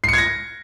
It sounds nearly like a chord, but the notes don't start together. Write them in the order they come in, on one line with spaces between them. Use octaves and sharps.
C7 C#7 G#6 A#6